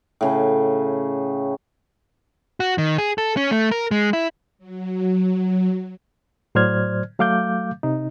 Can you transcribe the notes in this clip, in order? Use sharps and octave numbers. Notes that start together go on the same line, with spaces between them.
A2 C#3
F#4
D#3
G#4
A4
C#4
A3
A#4
G#3
E4
F#3
A2 F#3 C5 D5 F6 G#6
F#3 A3 F5 D6 G6
C3 D#4